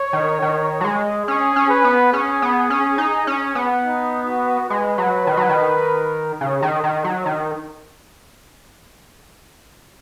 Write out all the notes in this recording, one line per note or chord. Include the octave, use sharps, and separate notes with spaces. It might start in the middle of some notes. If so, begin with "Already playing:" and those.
Already playing: C#5
D#3
D#3
F#3
G#3
C#4 G#4
C#4
B4
B3
C#4 G#4
B3
C#4
D#4
C#4
B3
D#4
F#4
G#3 B4
F#3
D#3
F#3
D#3
C#3
D#3
D#3
F#3
D#3